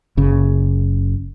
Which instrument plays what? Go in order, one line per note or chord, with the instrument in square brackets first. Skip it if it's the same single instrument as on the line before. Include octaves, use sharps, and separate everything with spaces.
[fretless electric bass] F#1 C#3